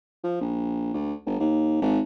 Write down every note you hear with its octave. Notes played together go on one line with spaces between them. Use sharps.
F3
A#1
D2
G1
D#2
G#1